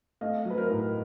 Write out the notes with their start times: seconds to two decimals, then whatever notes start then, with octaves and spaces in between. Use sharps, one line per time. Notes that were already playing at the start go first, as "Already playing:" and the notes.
0.21 A3 D#5 F5
0.45 F#3
0.50 B4
0.58 A#4 C5
0.70 A2